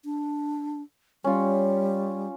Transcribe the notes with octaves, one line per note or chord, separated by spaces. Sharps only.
D4
G3 C#4 F4